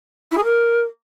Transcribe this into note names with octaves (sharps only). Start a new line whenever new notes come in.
E4
G#4
A#4